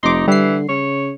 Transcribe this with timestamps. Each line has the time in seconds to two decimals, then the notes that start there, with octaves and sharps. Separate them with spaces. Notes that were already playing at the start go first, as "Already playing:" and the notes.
0.03 F1 D#4 C6 D6
0.28 D3 E3 G3 C7
0.69 C#3 C#5